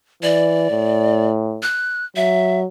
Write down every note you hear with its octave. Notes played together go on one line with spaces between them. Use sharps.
E3 D5
A2
F#6
F#3 E5